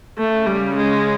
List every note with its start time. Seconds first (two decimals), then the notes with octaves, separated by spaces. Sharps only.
0.18 C#3 A3
0.47 G3
0.76 G#3